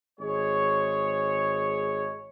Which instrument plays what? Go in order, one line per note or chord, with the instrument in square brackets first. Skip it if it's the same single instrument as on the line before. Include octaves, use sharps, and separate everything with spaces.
[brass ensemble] G#1 G#3 G#4 C#5